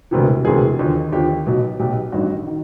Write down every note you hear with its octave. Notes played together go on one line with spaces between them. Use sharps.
E1 D2 C3 E3
E1 D2 C3 E3 G#4
D#2 D3 F3
D#2 D3 F3 G4
B1 B2
B1 B2 G4
A1 G2 D#3 F#4
D#3